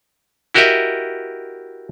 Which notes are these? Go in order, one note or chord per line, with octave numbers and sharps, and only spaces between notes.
E4 F#4 G4 A#4 D#5 E5